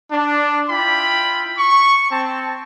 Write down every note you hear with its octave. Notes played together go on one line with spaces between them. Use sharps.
D4
E4 F4 G5 B5
C#6
C4 A5